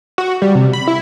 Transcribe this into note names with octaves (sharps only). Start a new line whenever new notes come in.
F#4
G3
C3
B5
E4